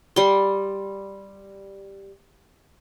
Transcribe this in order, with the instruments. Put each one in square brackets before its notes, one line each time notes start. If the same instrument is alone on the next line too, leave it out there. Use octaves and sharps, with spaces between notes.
[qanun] G3 C6